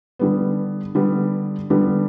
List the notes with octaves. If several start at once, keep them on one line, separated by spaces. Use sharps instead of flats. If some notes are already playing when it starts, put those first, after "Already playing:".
D3 G3 B3
D3 G3 B3
D3 G3 B3